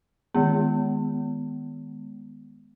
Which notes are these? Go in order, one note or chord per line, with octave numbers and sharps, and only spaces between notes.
D#3 G#3 B3